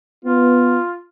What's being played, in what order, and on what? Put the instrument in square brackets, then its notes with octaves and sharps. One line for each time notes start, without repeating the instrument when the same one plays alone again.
[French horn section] B3 [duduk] F4